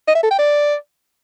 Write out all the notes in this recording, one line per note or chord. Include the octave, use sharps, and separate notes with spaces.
D#5
E5
A4
G5
D5